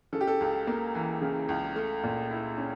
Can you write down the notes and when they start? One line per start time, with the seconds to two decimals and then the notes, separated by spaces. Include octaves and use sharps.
0.13 C#3 A4
0.21 G4
0.27 A4
0.41 C#2
0.67 A#3
0.95 E3
1.21 C#3
1.49 C#2
1.76 A3
2.03 A#2
2.30 E4
2.58 C#4